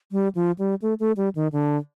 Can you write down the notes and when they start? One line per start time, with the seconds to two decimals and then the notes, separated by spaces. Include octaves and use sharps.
0.12 G3
0.35 F3
0.58 G3
0.82 A3
1.00 A3
1.17 G3
1.35 D#3
1.52 D3